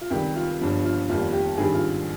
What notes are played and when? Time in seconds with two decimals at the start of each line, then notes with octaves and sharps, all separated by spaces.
0.01 F4
0.10 C#2 C3 D#3 G3 G4
0.36 F4
0.60 G1 G2 F3
0.84 F4
1.08 F1 D#2 D#3 G3 F4
1.33 G4
1.57 G#1 G2 D#3 G3 G#4
1.74 F4